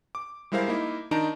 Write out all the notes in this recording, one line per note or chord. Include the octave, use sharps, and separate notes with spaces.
D6
G3 G#3 E4 A#4 C5 F5
A#3 D#4 E4
D#3 D4 D#4 A5 A#5 D7